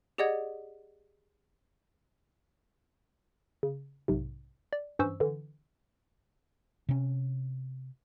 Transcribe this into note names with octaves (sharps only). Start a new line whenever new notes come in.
G4 G#4 D5 D#5 F#5 G#6
C#3
B1 G#2 C3
D5
G2 E3 C#4 C5 C#6 E6
D3 E3
C3 C#4